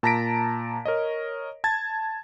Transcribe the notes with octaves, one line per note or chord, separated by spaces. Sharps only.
A#2 A5 A#5 A#6 B6 D7
A#4 C#5 D#5
A5 G#6 A6